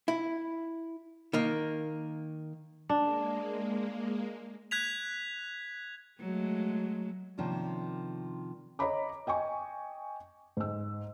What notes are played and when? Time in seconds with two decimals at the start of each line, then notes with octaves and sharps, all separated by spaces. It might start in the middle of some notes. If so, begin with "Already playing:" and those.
0.08 E4
1.33 D#3 A#3
2.89 G#3 A#3 D4
4.71 F#6 G#6 B6 F7
6.20 F#3 G#3 A3
7.38 C3 D#3 F3 A#3 C#4 D4
8.79 C#5 D#5 A#5 B5 D6
9.27 D#5 G5 G#5 C#6
10.57 G#2 E6